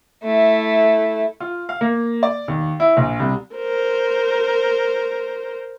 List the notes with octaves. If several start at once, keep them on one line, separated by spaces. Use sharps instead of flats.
A3 E4
F4
F5
A#3
D5
D#2
E4
A#1
C2
A#4 C5